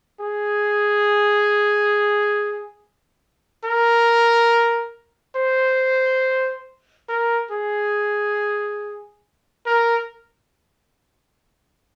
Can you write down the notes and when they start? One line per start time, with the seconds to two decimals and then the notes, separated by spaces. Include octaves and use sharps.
0.20 G#4
3.64 A#4
5.36 C5
7.09 A#4
7.51 G#4
9.66 A#4